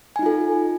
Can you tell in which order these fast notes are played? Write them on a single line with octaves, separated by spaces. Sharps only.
G#5 D#4 F4 A4